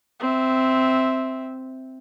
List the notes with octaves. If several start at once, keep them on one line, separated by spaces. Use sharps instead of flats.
C4 E5